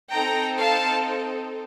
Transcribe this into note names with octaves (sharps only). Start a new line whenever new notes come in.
C4 D#4 A4 G5 A#5
F5 A5